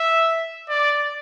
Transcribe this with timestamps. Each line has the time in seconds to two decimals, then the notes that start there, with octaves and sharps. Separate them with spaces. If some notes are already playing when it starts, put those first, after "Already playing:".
Already playing: E5
0.69 D5